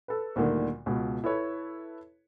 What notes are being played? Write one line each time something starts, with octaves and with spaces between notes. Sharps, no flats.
A4 B4
D2 A#2 D3 D#3 G3
C#2 B2
E4 A4 B4 C#5